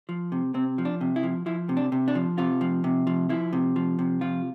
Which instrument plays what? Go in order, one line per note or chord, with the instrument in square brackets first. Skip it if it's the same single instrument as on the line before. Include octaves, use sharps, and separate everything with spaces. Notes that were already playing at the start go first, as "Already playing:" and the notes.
[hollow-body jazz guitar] F3
C3
C3 C4
F3
D4
C3
E4
F3
F3 E4
C3
D4
C3
D4
F3
C3 F4
F3
C3
F3
F3 E4
C3
F3
C3
F3 F4